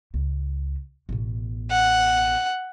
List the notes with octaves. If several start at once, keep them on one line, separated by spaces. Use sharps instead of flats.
C#2
A1 B2
F#5